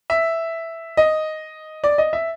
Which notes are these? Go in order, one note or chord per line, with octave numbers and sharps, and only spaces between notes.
E5
D#5
D5
D#5
E5